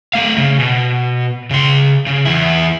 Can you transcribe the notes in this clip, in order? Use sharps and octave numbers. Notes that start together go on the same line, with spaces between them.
A3 F5
C#3
B2
C#3 C6
C#3
E2 E4